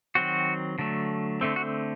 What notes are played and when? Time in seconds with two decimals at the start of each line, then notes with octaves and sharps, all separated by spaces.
0.15 D#3 F#3 C4 F#4
0.78 D3 F#3 A3
1.41 D3 A3 C4
1.56 F#4